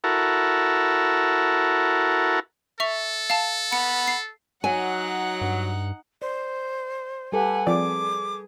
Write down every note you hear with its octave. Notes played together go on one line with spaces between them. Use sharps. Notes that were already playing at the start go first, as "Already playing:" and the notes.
E4 F#4 A4 A#4
A4 E5 C#6 F7
F5 A5
F#5 B5 C#7
C7
F#3 D#4 F#5 G#5
G2
C5 D5
G3 G4 A4 B4 F#5 G#5
F3 C4 G#4 D5 D6